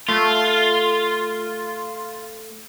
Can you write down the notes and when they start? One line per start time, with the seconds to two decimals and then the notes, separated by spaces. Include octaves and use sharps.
0.09 A3 F4